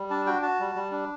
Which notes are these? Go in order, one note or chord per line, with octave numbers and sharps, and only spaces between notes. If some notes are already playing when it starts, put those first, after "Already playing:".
Already playing: G3
D4 A5
F#4 G5
F#4 A5
G3
G3
D4